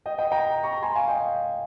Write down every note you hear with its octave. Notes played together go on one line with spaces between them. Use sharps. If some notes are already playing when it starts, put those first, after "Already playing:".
D#5 G5
D#5 G5
G5 A#5
A#5 C#6
G#5 C6
F5 G#5
D#5 G5